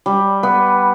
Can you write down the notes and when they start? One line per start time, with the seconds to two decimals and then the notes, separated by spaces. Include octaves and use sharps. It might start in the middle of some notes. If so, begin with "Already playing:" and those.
0.06 G3
0.43 B3